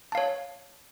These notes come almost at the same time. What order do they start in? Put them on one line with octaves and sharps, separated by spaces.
A5 F5 C#5